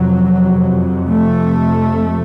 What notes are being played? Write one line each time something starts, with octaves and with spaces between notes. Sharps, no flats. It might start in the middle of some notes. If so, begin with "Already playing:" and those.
Already playing: F2 C3 F#3
A3